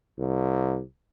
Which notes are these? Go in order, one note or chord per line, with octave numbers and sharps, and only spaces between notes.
C2